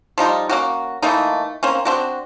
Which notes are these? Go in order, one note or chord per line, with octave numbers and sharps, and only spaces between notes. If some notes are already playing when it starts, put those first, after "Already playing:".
F3 G3 D#4 F4
A#3 C#4 F#4
E3 A3 A#3 D#4
A#3 C4 C#4
C4 D4 F#4